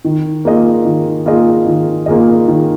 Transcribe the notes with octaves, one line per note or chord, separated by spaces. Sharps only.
D#3
A#3 F4 G#4 D#5
D#3
A#3 F4 G#4 D#5
D#3
A#3 F4 G#4 D#5
D#3